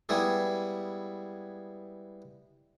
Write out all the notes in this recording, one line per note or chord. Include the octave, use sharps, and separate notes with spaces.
G3 G#3 B3 E4 G#4